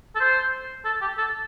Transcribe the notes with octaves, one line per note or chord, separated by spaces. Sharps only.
A4
C5
A4
G4
A4